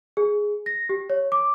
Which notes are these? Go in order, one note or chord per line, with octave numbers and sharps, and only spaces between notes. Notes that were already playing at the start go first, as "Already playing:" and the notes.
G#4
A#6
G4
C#5
D6